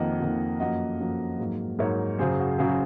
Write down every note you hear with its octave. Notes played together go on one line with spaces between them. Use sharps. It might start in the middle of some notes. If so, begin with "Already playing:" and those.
Already playing: F2 D#3 A#3 D#5 F#5
F2 D#3 A#3
F#2 F3 A#3 D#5 F#5
F#2 F3 A#3
G#2 F#3 A#3
G#2 F#3 A#3 A#4 C#5
F#2 C#3 F#3 G#4 C5
F#4
F#2 C#3 F#3 G#4
F#4